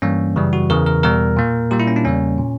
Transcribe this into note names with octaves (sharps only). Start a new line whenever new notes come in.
G2 E3 G3 A#3 C#4
F#2 C#3 E3 G3
F#4
E2 C#3 E3 A#4
A#4
E2 B2 G3 A#4
A#2 A#3
A#2 G3 A#3 G4
E4
C#4
D4
E2 C#3 G3 A#3 C#4
A#2